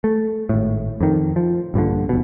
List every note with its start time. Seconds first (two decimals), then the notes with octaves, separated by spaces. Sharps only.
0.04 A3
0.49 G#1 A2
1.01 F2 D#3
1.36 F3
1.74 A#1 G2 A#2 D3
2.09 F1 B2